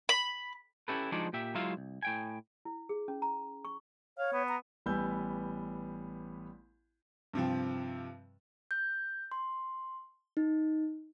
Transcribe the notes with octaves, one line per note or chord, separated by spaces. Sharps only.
B5
C#4 E4 G4 A4 B4
F3 G#3 D4 D#4 F#4 D5
A#2 G4 E5
F#3 G#3 E4 F4 E5 F5
C2
A2 G5 G#5
E4
G#4
C#4
A#5
C#6
C#5 F5
B3
A#5
A1 G3 B3 G#5 E6 G6
G2 C3 F3 C4
G6
C6
D#4